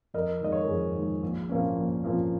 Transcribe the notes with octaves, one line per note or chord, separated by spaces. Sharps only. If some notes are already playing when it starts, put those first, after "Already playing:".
F2 A#4 D#5
D#3 G#3 D#5
C#5
A#4
F2 G#4
D#3 G#3
A#1
A#2 F3 A#3 C#4
A#1
A#2 F3 A#3 C#4